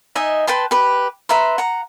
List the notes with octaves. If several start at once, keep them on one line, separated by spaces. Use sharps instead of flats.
D#4 D#5 E5 G#5
B4 G5 A5 C6
G4 B4
B4 E5 A#5 C6
F#5 A#5